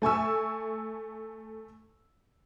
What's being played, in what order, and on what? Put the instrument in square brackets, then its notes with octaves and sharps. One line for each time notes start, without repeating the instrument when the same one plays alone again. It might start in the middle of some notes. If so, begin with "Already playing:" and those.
[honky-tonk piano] A3 G#5 C#6 E6